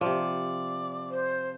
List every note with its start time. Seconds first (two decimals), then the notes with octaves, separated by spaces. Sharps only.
0.01 C3 F3 D5
1.10 C5